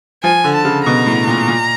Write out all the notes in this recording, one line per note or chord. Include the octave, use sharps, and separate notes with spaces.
F3 G#5
D3
A5
C#3
B2 A#5
A2
A#2
A#2